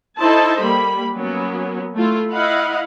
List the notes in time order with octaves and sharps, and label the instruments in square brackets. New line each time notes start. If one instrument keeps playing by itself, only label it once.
[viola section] D#4 E4 A4 C5 D#5 A5
G3 A#3 B5
F#3 A#3 B3 C#4
A3 E4 F4
E4 D#5 F5 F#5 B5